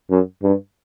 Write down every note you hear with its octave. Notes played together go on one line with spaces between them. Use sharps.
F#2
G2